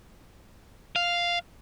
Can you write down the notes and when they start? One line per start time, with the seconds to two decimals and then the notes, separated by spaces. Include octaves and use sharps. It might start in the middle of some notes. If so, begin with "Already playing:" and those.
0.96 F5